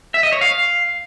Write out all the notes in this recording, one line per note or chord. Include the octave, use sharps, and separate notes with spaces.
E5
D#5
C#5
F5